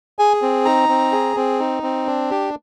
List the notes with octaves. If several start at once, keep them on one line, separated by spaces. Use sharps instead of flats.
G#4 G#5
C4
D#4 A#5
C4
G#4
C4
D#4
C4
D4
G4